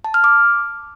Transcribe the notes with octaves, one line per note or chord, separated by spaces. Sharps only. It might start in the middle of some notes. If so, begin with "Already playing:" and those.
A5
F6
D6